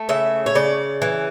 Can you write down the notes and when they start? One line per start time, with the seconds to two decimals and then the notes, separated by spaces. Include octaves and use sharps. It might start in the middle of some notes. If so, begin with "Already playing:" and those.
Already playing: A3
0.09 C#3 E5
0.46 C#5
0.55 C#3 D5
1.02 E3